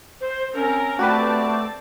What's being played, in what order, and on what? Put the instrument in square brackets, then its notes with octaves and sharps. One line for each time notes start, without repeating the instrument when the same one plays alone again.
[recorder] C5
[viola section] C4 A#4 A#5 [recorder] C#4
[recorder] A3 [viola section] C4 D5 A5 [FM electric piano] F#4 G4 B4